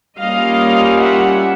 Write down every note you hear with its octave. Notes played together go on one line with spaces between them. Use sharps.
G3 A#3 C#4 F4 D#5 F5
E5 F#5